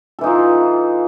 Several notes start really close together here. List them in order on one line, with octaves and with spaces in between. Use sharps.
A4 E3 D#4 F4